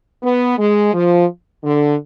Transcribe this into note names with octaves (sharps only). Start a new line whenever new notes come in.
B3
G#3
F3
D3